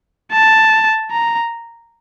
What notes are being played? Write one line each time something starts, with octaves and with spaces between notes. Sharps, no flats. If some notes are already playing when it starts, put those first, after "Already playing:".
A5
A#5